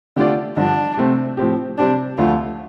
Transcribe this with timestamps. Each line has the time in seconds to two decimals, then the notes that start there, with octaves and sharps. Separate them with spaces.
0.16 D3 A3 D4 F4 G4 D5
0.57 G2 D3 F3 D4
0.97 C3 A3 C4
1.37 A2 F3 C4 G4
1.78 C3 G3 C4 D4 G4 D5
2.18 D2 D3 F3 A3 F4